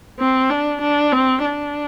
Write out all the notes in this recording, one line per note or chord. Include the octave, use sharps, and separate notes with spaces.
C4
D4
D4
C4
D4